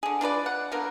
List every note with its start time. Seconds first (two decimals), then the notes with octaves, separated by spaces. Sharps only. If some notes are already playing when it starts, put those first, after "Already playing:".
0.03 D3 G#4
0.21 D4 F4 B4 D5
0.46 F#5
0.72 D3 A#3 B3 A#4